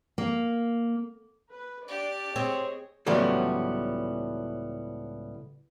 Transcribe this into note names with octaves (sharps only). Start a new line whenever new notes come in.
A#3
B4
D4 G4 D5
C4 G#4 C#5 D#5
C#2 A2 E3 F#3 G3 B3